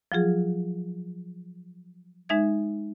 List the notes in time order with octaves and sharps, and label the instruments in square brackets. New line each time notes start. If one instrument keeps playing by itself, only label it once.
[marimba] F3 F#3 F4 G#4
G#3 D#4 E5 G#6